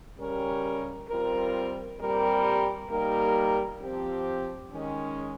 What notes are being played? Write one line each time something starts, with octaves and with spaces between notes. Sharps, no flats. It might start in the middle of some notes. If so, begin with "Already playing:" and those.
C#3 G3 C#4 G4 A#4
G3 C4 F4 A#4
A#2 G3 C4 G4 A#4
G3 A#3 D#4 G4 A#4
F3 C4 G4
D#3 G#3 C#4